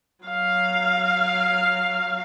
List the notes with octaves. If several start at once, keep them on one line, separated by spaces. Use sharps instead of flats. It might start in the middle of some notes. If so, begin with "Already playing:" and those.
F#3 F5